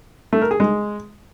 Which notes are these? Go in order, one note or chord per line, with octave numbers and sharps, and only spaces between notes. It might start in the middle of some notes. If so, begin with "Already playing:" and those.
A3
A#4
G#4
G#3